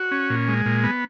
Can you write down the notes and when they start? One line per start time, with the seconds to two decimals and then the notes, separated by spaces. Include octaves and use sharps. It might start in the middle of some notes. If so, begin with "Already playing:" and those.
Already playing: F#4
0.11 C#4
0.30 A#2
0.48 G#3
0.66 A#2
0.84 B3